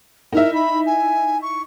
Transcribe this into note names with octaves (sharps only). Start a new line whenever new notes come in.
D#4 E4 A#4 E5
B5
G#5
C#6